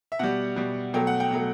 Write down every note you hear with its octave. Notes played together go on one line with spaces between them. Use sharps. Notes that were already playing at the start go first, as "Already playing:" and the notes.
E5
B2 G3 F#5
B2 G3
B2 F#3 A3 G5
F#5
G5
B2 F#3 A3